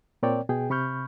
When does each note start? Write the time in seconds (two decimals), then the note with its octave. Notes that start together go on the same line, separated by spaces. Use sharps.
0.23 A#2 C4 A#4 C#5 D5 G5
0.49 B2 G#4 G5
0.70 C3 B5 C#6 F6 G6